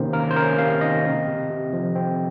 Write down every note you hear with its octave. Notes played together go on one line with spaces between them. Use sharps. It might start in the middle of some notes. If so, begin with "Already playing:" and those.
Already playing: C3 D#3 A#3 C#4 C5
A#3 A#4
C5
C#4 A#4
C3 F5
D#3 D#5
C4
C3
C3
F3
C4